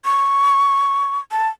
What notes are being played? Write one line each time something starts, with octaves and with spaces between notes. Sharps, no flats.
C#6
A5